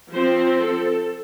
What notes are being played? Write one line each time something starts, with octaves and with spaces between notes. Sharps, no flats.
F3 C4 C5
A4